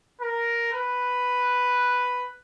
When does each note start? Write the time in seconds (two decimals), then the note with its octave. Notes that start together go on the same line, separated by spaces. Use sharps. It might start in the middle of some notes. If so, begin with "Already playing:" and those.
0.21 A#4
0.73 B4